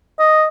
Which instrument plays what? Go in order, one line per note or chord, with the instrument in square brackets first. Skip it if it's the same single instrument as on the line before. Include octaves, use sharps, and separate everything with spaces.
[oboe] D#5